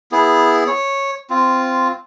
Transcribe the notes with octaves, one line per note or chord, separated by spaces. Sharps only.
B3 E4 G#4
C#5
C4 F4